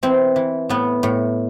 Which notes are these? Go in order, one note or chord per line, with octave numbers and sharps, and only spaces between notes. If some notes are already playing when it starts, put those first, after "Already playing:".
E3 C4
E3
A2 B3
A2